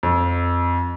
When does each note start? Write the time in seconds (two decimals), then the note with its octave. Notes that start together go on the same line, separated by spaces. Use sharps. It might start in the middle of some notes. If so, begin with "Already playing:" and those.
0.03 F2